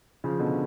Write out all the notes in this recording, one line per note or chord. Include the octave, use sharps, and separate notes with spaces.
C#3 F3
B2 D3